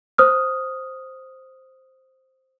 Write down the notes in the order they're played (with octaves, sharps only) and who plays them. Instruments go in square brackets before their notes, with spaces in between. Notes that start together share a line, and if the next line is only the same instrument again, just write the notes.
[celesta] C5 D#6 F6